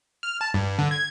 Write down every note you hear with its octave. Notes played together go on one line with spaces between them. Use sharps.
F6
A5
G2
D3
G#6